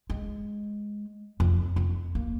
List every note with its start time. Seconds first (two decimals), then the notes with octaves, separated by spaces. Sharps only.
0.10 G#3
1.40 F2
1.76 F2
2.15 A#3